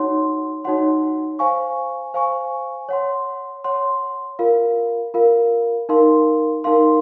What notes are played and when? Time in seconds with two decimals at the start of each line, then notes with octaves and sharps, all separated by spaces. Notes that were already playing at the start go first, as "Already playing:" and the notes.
Already playing: D#4 F#4 C#5 F#5 C6
0.64 D#4 F#4 C#5 F#5 C6
1.39 C5 F5 G#5 C#6
2.14 C5 F5 G#5 C#6
2.89 C#5 F#5 C6
3.64 C#5 F#5 C6
4.39 F4 A#4 F5
5.14 F4 A#4 F5
5.89 D#4 A#4 F5 C6
6.64 D#4 A#4 F5 C6